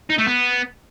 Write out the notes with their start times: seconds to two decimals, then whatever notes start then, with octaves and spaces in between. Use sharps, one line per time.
0.10 D#4
0.18 A3
0.27 B3